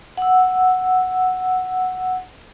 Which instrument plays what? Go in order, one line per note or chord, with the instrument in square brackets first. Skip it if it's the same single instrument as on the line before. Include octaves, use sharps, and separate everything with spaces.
[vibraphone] F#5 E6